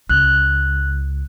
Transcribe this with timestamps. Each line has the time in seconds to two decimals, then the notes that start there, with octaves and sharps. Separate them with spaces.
0.09 C#2 F#6